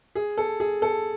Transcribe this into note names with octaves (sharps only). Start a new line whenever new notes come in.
G#4
A4
G#4
A4